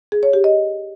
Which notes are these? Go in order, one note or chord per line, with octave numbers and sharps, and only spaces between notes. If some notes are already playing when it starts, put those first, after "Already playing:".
G#4
C#5
G4
D#5